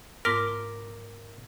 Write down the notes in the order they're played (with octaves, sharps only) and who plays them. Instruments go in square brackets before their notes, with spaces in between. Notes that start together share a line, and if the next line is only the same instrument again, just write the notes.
[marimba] G#2 B3 F4 [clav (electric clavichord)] A#4 [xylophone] C6 D6 B6 [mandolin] F6